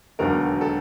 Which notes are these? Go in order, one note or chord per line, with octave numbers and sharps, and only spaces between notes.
E1 D#2 D3 F#3 B3 A#4
A4